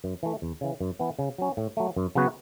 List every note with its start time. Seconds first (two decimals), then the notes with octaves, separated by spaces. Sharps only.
0.04 F#2
0.23 E3 A3
0.42 E2
0.61 C#3 E3
0.81 F#2
0.99 E3 B3
1.19 C#3
1.38 F#3 C#4
1.57 A2
1.77 F#3 A3
1.96 F#2
2.15 C#3 F#3 B3 F#4